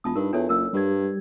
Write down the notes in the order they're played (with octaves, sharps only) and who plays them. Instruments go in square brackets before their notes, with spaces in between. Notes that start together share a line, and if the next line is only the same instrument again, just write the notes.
[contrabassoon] E1 [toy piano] F4 A5 D#6
[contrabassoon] G2 [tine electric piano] D#4 [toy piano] A#4
[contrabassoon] E2 [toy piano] D4 A4 C#5 [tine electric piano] F4
[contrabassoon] F#1 [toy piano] A#4 E6
[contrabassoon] G2 [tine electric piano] G3 G4 G#6